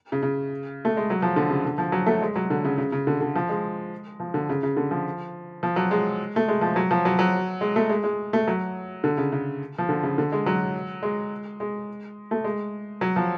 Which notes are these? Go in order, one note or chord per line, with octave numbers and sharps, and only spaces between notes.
C#3
C#3
A3
G#3
F#3
F3
D3
C#3
D3
F3
F#3
A3
G#3
F#3
D3
C#3
C#3
C#3
D3
D3
F3
G#3
F3
D3
C#3
C#3
D3
F3
F3
F#3
G#3
A3
G#3
F3
F#3
F3
F#3
F#3
G#3
A3
G#3
G#3
A3
F#3
D3
C#3
C#3
F3
D3
C#3
D3
G#3
F#3
G#3
G#3
A3
G#3
F#3
F3